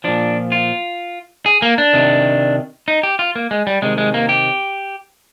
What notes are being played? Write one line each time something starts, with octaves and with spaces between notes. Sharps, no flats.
A#2 F3 D4
F4
G#4
A#3
D4
C3 D#3
D#4
G4
F4
A#3
G#3
G3
C3 D#3 G#3
G#3
A#3
G4